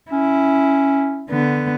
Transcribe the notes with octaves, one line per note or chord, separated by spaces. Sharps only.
C#4 E4
D3 B3